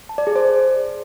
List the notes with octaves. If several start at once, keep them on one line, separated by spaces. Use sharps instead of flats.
A5
D5
G#4
C5